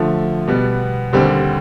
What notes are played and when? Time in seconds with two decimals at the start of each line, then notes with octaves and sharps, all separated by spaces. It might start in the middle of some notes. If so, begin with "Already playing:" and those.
Already playing: D3 F3 A3
0.48 B2 G3 B3
1.13 D#2 D3 G3 C4